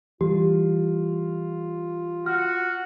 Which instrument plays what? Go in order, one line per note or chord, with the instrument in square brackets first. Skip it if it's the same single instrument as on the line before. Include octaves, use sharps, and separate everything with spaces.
[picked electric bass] E3 G3 [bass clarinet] F4 [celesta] G4
[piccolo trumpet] F#4 [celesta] F6